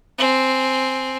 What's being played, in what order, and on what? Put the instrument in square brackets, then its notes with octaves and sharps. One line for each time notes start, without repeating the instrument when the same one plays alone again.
[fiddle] C4 G#5